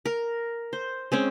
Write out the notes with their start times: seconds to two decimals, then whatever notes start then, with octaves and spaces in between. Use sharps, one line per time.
0.06 A#4
0.73 C5
1.12 G#3 C4 C#4